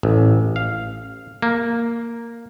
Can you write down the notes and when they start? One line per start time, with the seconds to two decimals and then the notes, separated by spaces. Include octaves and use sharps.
0.03 A1
0.56 F5
1.42 A#3